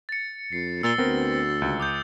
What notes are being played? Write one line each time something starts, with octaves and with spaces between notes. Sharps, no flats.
A6 C#7
F2 C7
A#2 E6 A6 G7
D2 B3 C4 A#4
C#2
D6 D#6 G6